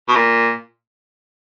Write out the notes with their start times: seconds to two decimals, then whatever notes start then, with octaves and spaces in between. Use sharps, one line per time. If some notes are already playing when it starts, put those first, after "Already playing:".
0.09 B2
0.16 A#2